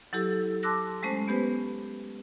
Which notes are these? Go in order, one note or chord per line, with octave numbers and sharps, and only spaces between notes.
F#3 E4 G4 A4 E6
A5 C6 D6 E6 F#6 A#6
G#3 A3 C#4 C5
B3 G4 B4 C5